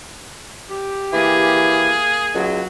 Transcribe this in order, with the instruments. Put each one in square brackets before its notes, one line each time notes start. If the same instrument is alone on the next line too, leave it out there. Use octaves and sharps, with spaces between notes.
[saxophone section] G4
[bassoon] E3 [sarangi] A#3 [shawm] G#4
[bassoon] C#2 [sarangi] F#3